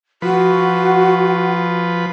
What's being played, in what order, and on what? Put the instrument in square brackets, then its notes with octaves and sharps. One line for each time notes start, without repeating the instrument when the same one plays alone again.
[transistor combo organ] F3 B4 [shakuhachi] F#4